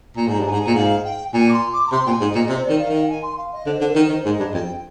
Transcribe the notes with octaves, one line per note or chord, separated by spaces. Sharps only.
A#2 A#5
G#2
G2
G#5
G#2 A#5
G#5
A#2
G#2 F5
G5
A#2 G#5
D6
C6
D6
A#5
C3 C6
A#2 G5
G#5
G#2
D#5
A#2
C3 C5
D#3 D5
F5
D#3 F5
G5
G#5
C6
F5
D#5
D3 C5
D3
A#4
D#3
D#3 C5
G#2 D#5
G2
F2 G5